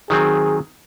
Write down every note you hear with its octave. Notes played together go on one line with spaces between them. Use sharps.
D#3 F#3 C4 G#4